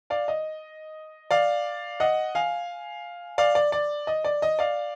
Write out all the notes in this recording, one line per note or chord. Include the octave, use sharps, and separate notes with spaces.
D5 F5
D#5
D5 F5
D#5 F#5
F5 G#5
D5 F5
D5
D5
D#5
D5
D#5
D5 F5